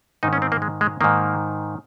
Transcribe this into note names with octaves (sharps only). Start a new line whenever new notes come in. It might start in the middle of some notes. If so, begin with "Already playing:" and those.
G#2 D#3 D#4
C#4
C4
A#3
G#3
G#3
G#2 D#3 A#3